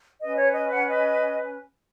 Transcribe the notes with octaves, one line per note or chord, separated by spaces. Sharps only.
C#4 B4 D#5
C#5
D#5
F#5
D#5